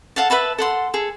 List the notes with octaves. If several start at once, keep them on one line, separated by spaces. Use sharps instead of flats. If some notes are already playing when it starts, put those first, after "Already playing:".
A4 F5 F#5 A5
B4 E5 A5 B5
A4 F#5 C6
G#4 A4